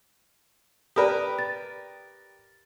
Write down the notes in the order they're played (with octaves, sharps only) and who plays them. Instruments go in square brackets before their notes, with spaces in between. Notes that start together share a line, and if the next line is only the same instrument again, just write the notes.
[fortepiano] G4 A#4 B4 [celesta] D5 B5 D#6
[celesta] A6